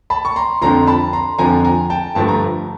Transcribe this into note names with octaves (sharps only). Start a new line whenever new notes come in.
A5 B5
C#6
A#5 C6
F2 D3 F3 A#5 C6
A5 B5
A#5 C6
F2 D3 F3 G#5 A#5
G#5 A#5
G5 A5
G2 D3 F3 A3 A5
A#5